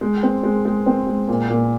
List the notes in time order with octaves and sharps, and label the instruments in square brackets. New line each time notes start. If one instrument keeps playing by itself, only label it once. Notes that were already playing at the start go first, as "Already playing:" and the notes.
[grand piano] G#3
C4
G#3
G#3
C4
G#3
A#2
A#2